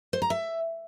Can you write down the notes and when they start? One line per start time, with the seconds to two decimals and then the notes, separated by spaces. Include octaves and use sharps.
0.13 C5
0.22 A#5
0.30 E5